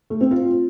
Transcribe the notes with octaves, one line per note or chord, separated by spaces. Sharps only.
A3
C4
F4